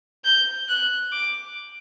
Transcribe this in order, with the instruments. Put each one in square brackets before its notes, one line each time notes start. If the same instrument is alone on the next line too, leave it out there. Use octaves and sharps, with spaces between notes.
[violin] G6
F#6
D6